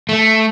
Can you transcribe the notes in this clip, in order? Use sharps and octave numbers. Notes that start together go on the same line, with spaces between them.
A3